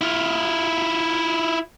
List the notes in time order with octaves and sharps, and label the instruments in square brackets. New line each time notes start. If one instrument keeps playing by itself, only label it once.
[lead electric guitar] E4 F4